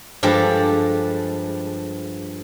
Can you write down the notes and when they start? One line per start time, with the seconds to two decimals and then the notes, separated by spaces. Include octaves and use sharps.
0.23 G2 F3 G#3 G4 A4